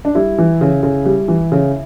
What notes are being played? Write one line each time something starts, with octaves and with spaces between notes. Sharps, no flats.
D4
G3 E4
E3
C#3
C#3
G3
E3
C#3